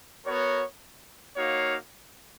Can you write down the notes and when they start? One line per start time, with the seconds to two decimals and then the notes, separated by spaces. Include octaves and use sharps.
0.25 B3 F#4 A#4 C#5
1.36 A#3 D#4 F#4 C#5 F5